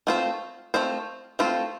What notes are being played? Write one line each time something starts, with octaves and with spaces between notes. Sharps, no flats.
A3 C4 F4 C5
A3 C4 F4 C5
A3 C4 F4 C5